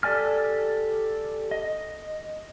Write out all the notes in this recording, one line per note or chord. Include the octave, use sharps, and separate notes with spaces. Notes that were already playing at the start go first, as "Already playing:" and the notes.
G4 A4 D5 G#5 F6
D#5